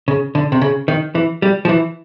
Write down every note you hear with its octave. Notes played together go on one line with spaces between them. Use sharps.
C#3
D3
C3
C#3
D#3
E3
G3
F3
E3